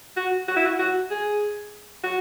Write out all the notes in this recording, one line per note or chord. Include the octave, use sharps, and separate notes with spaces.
F#4
F#4
E4
F#4
F#4
G#4
F#4